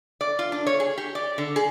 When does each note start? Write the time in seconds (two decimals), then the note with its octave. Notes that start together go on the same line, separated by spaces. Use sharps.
0.21 D5
0.39 F4
0.52 D4
0.67 C#5
0.80 G#4
0.98 G4
1.15 D5
1.38 D3
1.56 G#4